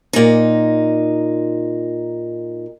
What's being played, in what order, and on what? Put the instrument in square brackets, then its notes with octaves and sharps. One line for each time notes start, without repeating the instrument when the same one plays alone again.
[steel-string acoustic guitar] A#2 D#4